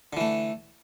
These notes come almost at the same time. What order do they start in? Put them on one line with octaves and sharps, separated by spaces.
D3 E3 A3